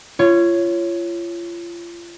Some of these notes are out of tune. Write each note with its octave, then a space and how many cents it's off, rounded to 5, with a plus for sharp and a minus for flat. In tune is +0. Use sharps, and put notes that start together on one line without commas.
F4 -30 C#5 +0